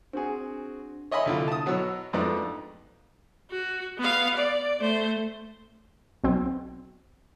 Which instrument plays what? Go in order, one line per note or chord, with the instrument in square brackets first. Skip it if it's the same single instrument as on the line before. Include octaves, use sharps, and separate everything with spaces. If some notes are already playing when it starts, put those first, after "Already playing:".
[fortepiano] C4 F#4 G#4 [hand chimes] D4
[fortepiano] C#5 D#5 E5 G#5 B5 C6
C2 D3 F4
A5 D#6
B2 F#3 F#4 C#5 E6
F2 G#2 A3 B3 D4
[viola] F#4
B3 F5
D5
A3 C5
[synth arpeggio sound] B1 C4